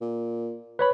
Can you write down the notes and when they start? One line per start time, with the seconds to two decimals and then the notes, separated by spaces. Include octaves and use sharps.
0.01 A#2
0.79 B4 C#5 B5